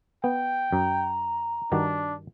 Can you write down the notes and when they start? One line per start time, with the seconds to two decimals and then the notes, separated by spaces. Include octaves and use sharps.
0.24 B3 G5
0.73 F#2 A#5
1.72 G2 D#3 D4 F#4